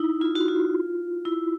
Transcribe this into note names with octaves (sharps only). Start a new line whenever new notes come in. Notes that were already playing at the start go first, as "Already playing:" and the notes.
Already playing: D#4 E4
F4
F#4
F4
E4